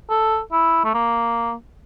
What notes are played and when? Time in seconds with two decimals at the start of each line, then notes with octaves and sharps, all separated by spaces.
0.10 A4
0.52 E4
0.84 A3
0.94 A#3